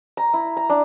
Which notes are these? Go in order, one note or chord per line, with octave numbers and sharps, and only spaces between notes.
A#5
E4
A#5
D4